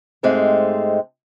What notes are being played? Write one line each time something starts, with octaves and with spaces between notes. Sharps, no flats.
G#2 G#3 A3 C4 G4